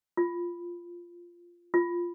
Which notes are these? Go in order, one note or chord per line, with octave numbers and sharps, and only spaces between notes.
F4
F4